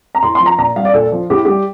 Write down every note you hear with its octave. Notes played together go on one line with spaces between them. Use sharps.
A#5
A2 C6
C6
F3
A#5
A#2 A#5
G3 F5
D5
A#2 A4
F3
A2 G4
G3 G4